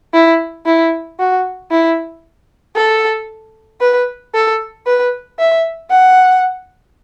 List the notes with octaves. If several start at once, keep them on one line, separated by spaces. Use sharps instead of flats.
E4
E4
F#4
E4
A4
B4
A4
B4
E5
F#5